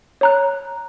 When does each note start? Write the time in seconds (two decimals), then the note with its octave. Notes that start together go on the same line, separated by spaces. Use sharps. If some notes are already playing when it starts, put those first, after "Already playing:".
0.21 C#5 A#5 F#6